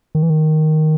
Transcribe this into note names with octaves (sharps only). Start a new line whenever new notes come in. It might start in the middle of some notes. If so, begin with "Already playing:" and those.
D#3
E3
D#3